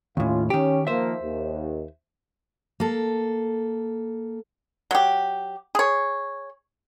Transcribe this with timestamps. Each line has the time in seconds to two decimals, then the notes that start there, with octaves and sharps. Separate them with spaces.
0.17 D#2 A2 C#4 F4
0.50 D#3 C#4 G4
0.87 D#3 F3 A#3 C5 E5
1.22 D#2
2.80 A#3 A4
4.91 F#3 G4
5.75 G#4 C#5